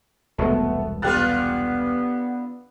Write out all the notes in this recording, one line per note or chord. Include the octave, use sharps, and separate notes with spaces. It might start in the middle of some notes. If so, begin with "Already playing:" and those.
E1 C2 G#3 A3 B3
D3 B3 F4 G4 B4 F#6 A6